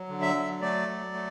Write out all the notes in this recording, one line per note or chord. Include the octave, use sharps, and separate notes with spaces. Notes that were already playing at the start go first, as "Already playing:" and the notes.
Already playing: F#3
D3
E5
F#3
A3 D5
F#3
A3